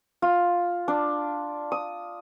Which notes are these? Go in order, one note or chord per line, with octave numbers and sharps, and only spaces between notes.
F4
D4
D#6